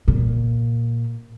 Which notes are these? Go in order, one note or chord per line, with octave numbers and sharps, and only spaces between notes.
A#2